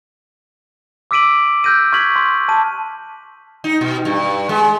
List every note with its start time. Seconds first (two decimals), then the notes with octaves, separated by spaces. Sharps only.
1.11 D6 E6 B6 D7 D#7 F#7
1.64 E6 F#6 G6 A#6 D#7
1.93 C#6 F6 F#6 G#6 B6 F#7
2.16 C6
2.48 A5 D#7
3.64 D#4
3.81 B2
4.05 G2
4.49 G#3